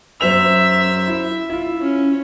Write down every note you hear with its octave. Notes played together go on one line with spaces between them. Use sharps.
F#2 C5 E5 F7
E4
E4 F4
C#4